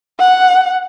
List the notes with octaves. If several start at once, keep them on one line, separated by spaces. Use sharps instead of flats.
F#5